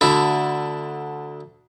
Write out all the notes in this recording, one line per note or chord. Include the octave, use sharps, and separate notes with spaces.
D2 D3 E4